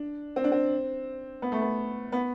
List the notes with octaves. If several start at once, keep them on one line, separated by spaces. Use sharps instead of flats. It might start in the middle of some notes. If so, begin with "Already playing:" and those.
Already playing: D4
C4
D4
C4
B3
A3
B3
B3